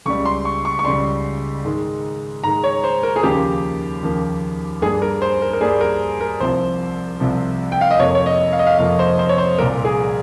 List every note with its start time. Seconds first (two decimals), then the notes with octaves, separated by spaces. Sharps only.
0.06 C#2 C#3 G3 C#6
0.25 C6
0.45 C#6
0.65 C#6
0.79 C#6
0.85 C#2 C#3 G3 C6
1.65 G#2 D#3 G#3
2.44 G#2 D#3 G#3 A#5
2.64 C#5
2.84 C5
3.03 A#4
3.16 G#4
3.23 D#2 C#3 F3 A#3 G4
4.03 D#2 C#3 F3 A#3
4.82 G2 G3 A#3 G#4
5.02 A#4
5.22 C5
5.42 A#4
5.53 A#4
5.61 G2 G3 A#3 G#4
5.81 A#4
6.21 A#4
6.40 C2 C3 F3 C5
7.20 C2 C3 F3
7.72 G5
7.81 F5
7.91 D#5
7.99 F2 C3 F3 A#3 C#5
8.15 C#5
8.26 D#5
8.52 F5
8.59 D#5
8.66 F5
8.78 F2 C3 F3 A#3 F5
8.99 C5
9.19 C5
9.29 C#5
9.38 C5
9.58 C2 A#2 F3 A#4
9.85 G#4